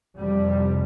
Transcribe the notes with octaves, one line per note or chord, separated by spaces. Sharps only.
F2 C3 G3